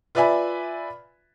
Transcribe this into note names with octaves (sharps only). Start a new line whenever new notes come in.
F4 B4 D5 E5 G#5 B5